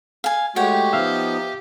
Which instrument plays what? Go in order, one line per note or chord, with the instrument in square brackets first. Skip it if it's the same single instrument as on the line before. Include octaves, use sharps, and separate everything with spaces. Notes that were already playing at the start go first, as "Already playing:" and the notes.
[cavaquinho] F5 G#5
[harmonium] G#3 A3 F#4 [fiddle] G4 [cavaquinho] C#5 F#5 G5
[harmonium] F3 B3 D#4 [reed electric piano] E5 F5